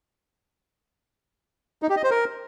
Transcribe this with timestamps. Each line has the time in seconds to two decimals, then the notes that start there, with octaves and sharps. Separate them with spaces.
1.82 D#4
1.89 G4
1.97 D#5
2.04 C5
2.11 A#4